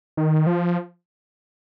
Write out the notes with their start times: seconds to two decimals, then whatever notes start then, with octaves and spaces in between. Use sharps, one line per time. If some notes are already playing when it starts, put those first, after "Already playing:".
0.17 D#3
0.47 F3